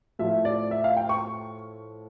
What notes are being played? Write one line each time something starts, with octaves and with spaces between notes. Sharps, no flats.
A2 F3 E5
D5
E5
F5
G5
C#6